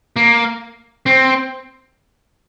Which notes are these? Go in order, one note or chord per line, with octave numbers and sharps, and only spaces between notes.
A#3
C4